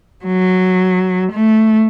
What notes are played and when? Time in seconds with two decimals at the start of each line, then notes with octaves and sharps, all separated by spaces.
0.25 F#3
1.31 A3